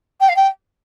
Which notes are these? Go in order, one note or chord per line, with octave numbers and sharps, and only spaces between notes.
G5
F5
G5